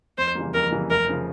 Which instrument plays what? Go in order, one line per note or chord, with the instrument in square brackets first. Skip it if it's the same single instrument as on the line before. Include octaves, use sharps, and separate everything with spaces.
[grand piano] F2 [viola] C5
[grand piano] C#3 E3 G3 A#3
[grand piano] F2 [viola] A#4
[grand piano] C#3 E3 G3 A#3
[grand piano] F1 [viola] A#4
[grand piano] C#3 F3